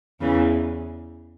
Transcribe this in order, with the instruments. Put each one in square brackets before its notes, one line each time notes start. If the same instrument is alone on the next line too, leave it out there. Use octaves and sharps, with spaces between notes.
[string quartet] E2 C#3 E3